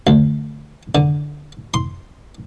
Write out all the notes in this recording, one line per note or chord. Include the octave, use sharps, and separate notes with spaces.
D2
D3
C6